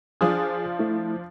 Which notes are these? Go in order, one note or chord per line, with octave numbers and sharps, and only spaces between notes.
F3 D4 F4 G#4 G#5 D#6
A3 E4